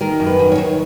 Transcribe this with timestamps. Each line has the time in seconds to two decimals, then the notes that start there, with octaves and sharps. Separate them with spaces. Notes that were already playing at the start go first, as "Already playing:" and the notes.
0.01 D#3 A#4
0.20 F#2
0.26 B4
0.39 D#3
0.52 C#5
0.58 D#3